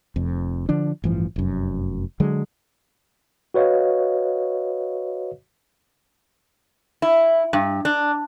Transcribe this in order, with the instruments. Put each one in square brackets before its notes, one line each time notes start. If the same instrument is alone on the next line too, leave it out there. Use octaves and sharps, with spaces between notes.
[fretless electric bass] F1 F2
D3 F3 D4
A1 G2 E3 F3
F1 F#2
D3 F#3 G#3
[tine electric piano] F#4 B4 C#5 D#5 F5
[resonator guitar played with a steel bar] E4
G2
D4